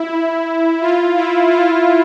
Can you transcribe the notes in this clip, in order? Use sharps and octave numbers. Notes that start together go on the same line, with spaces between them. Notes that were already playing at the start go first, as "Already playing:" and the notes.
Already playing: E4
F4
E4
F4